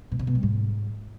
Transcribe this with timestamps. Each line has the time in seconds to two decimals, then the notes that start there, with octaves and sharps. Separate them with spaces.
0.12 B2
0.19 C3
0.27 B2
0.35 G3
0.43 G#2